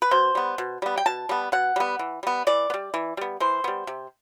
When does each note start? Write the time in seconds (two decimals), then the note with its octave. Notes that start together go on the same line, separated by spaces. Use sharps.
0.02 B4
0.11 B2 C5
0.35 G3 B3
0.58 B2
0.82 G3 B3
0.97 G5
1.06 B2 A5
1.29 G3 B3
1.52 B2 F#5
1.76 G3 B3
1.99 E3
2.23 G3 B3
2.47 E3 D5
2.70 B3
2.74 G3
2.94 E3
3.17 G3 B3
3.40 E3 C5
3.64 G3 B3
3.87 C3